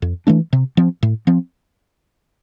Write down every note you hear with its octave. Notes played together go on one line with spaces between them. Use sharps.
F2
E3 A3 D4
C3
F3 C4
A2
F3 C4